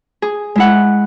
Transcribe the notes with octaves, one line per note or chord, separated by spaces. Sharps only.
G#4
G#3 E4 F#5